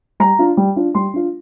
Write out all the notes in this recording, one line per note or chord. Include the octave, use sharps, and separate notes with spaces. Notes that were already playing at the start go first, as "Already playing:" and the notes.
G3 A#5
D4 F4
G3
D4 F4
G3 C6
D4 F4